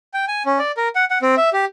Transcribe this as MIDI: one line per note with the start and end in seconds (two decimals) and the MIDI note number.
0.14 0.25 79
0.28 0.43 80
0.46 0.59 61
0.59 0.72 74
0.77 0.88 70
0.95 1.05 78
1.11 1.18 78
1.22 1.35 60
1.37 1.50 76
1.53 1.65 67